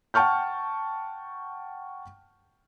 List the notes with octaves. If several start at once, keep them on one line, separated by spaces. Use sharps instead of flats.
F#5 G5 A5 C#6 F6 G6